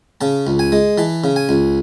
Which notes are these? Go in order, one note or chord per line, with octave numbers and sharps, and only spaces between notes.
C#3 A5
C#2
G#5
G#3
E3 A5
C#3
G#5
C#2